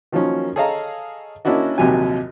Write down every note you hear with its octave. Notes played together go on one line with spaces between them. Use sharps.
D#3 F3 F#3 A#3 C#4
G#4 A4 C#5 D#5 F5 A#5
A#3 C#4 D4 E4 F#4 D#5
A#1 D#2 C3 F#3 G4 G#5